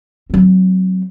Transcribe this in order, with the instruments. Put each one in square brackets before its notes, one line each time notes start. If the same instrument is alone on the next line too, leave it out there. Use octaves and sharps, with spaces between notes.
[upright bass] F#3 C4